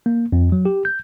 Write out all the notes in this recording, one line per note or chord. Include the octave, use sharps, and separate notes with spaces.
A#3
F2
F#3
G4
G6